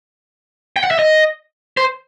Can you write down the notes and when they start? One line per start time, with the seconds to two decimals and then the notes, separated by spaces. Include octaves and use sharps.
0.76 G5
0.84 F#5
0.91 E5
0.99 D#5
1.77 C5